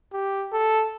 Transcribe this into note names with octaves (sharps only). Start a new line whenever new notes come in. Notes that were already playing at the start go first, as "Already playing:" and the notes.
G4
A4